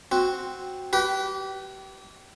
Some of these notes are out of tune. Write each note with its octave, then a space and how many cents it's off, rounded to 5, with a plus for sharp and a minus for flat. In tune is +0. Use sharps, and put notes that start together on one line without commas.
C4 +0 F#4 +0
G4 -30 B4 +0